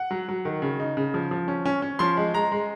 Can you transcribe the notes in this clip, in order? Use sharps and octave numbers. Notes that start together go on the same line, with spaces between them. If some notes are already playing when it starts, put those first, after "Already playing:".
Already playing: F#5
F#3
F#3
D#3
C#3
D#4
C#3
F3
F3
C#4
C#4
C#4
F3 C6
G#3
G#3 A#5
G#3